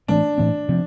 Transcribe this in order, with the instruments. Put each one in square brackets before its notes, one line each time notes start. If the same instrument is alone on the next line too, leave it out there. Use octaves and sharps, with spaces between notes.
[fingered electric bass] A2 E3 A3 C4 [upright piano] D4
[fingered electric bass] A2 E3 A3 C4
C3 F3 C4